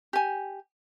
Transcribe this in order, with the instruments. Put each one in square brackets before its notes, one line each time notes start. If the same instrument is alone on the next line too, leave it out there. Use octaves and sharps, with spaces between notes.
[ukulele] G4 G#5